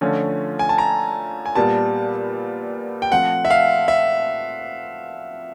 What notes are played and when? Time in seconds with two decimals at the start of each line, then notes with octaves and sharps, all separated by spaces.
0.01 D3 F3 A3 C#4 F4
0.59 G#5
0.69 A5
0.78 A#5
1.46 G#5
1.55 A#2 G3 B3 A5
3.02 G5
3.11 F3 A3 C4 F#5
3.45 E5
3.50 F5
3.88 E5